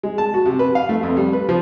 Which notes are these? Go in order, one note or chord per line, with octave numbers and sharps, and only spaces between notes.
G#3
A5
F#4
C3
B4
F5
A3
F2
G3
B4
F3